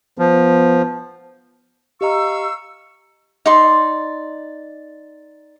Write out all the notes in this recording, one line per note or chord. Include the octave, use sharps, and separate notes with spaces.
F3 B3
G4 D#5 F5 A#5 C#6 E6
D#4 D5 C6